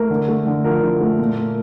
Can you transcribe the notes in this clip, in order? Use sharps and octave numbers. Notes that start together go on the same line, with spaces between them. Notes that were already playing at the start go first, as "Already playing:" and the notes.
Already playing: A3 A#4
D3
A3
D3
F3 A#4
D3
A3
A#2
A#3